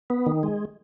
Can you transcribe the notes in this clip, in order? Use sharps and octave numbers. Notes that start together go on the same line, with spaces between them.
B3
D#3
G#3